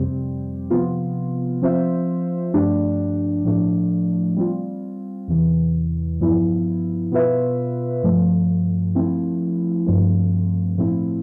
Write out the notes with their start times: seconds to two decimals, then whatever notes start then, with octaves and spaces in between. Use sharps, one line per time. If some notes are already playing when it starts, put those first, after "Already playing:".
Already playing: F2 C3 G3 C4 G4
0.70 C3 F3 B3 F4
1.62 F3 C4 F4 C5 E5
2.54 G2 F3 A3 D4 G4
3.45 A2 F3 A3 D4
4.36 G3 C4 F4
5.28 E2 C3 E3
6.20 G2 F3 B3 E4
7.11 B2 B3 F4 B4 E5
8.03 G2 F3 A3
8.95 F3 A3 C4 E4
9.86 G2 F3 A3 C4
10.78 A2 F3 A3 C4 E4